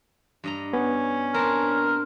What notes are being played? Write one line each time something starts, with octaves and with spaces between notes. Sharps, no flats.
G2 D#5 A#5
B3 C#4
C4 D4 A#4